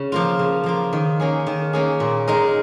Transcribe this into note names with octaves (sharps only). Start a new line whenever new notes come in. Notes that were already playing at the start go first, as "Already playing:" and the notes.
Already playing: C#3
F3 A#3 F4
C#3
F3 A#3 F4
D#3
A#3 C#4 G#4
D#3
A#3 C#4 G#4
A#2
G#3 D#4 A#4